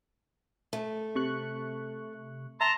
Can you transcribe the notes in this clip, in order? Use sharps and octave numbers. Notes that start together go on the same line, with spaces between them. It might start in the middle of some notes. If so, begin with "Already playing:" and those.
A3
C3 C#6 F#6
E5 A5 A#5 C6